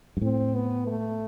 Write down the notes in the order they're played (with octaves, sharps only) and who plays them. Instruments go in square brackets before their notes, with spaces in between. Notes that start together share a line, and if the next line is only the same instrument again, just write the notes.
[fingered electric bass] G2
[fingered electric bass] A2 [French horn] C4
[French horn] B3
A3